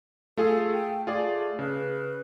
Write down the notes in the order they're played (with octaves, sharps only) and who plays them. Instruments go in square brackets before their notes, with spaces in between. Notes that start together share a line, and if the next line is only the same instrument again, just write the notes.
[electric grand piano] A3 F4 G#4 [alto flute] A4
[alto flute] G5
[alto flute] A3 [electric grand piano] F4 G#4 D5
[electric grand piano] C#3 [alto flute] B4